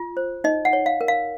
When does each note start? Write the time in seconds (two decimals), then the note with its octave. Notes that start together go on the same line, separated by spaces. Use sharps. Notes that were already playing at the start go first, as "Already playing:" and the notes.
Already playing: F4
0.17 C5
0.44 D#4 D#5
0.65 F#5
0.73 C#5
0.86 F5
1.01 A#4
1.08 F5